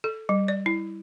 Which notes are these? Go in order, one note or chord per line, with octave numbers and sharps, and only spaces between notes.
A4
G3
D5
E4